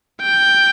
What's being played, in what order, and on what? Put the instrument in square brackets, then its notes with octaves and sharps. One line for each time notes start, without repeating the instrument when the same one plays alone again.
[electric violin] G5